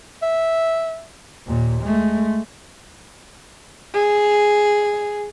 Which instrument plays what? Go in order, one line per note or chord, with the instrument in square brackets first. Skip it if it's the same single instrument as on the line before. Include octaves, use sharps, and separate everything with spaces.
[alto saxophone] E5
[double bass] D#2 A#2
G#3 A3
[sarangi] G#4